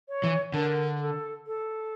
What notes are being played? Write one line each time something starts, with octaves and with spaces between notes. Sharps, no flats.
C#5
E3
D3 A#4
A4
A4